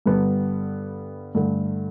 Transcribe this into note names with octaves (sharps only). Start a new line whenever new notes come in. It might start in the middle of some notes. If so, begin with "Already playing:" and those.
G2 D3 G3 B3
G2 D3 A3